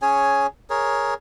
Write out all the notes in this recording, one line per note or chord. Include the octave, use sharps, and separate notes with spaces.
C#4 G#4 C#5 G#5
G#4 A#4 C#5